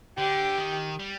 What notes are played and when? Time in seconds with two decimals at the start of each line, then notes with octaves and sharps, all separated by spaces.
0.18 D3 G4
0.58 D#3
1.00 G3